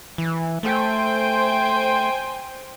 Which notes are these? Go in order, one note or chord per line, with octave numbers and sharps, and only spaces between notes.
E3
A3 C5 G5 G#5